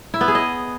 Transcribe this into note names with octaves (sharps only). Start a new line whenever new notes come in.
E4
B3
G#4
D#5